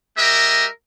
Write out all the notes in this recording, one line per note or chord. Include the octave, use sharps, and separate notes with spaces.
G#3 G4 A#4 D#5 E5